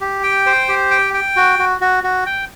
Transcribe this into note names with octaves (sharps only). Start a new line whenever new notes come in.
G4
G5
C5
G4
G5
G5
F#4
F#4
F#4
F#4
G5